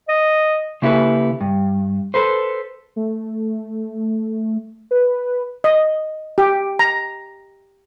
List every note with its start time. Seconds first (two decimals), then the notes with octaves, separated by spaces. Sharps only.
0.09 D#5
0.82 C#3 A#3 E4 G4 A4 B4
1.41 G2
2.14 A4 B4 C5
2.96 A3
4.91 B4
5.64 D#5
6.38 G4
6.79 A#5